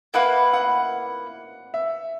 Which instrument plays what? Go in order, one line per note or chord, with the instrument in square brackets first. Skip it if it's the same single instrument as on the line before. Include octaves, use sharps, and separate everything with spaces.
[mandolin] A#3 E4 B4 [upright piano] F#5
[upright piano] F#5
E5